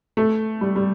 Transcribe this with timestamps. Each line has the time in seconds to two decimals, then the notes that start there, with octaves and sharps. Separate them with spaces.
0.17 A3
0.61 G3
0.76 G3